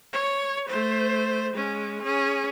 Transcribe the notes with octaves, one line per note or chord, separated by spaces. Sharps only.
C#5
A3 C5
G#3 C#4
C#4 G#4